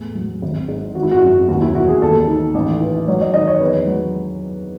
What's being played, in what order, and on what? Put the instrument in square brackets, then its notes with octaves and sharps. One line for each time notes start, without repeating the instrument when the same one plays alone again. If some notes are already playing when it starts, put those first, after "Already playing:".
Already playing: [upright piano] E2 A2
F#3
G#1
G#2
G#1 F#4
E4
F#4
F#2
D#2 F#4
E4
E1 F#4
G#4
D#2 A4
D#3
A1
E3
F#3 C#5
D#5
D#3 D#5
C#5
E2 B4
F#3